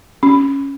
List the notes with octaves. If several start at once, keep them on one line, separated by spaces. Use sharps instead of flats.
C#4